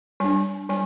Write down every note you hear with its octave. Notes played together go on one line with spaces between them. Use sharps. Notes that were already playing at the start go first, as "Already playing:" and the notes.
G3 D4 G#5
G3 G#5